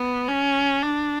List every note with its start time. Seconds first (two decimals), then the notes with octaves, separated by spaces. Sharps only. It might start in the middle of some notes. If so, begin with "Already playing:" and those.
Already playing: B3
0.29 C#4
0.83 D4